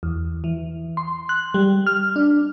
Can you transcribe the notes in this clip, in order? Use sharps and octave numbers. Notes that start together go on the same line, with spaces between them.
E2
E3
C6
F#6
G3
F6
D4